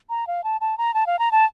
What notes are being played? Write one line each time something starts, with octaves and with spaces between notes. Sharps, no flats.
A#5
F5
A5
A5
A#5
A5
F5
A#5
A5